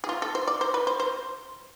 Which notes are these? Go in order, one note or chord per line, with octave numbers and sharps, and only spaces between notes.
G#4
F4
A4
C5
D5
C5
B4
C5
C5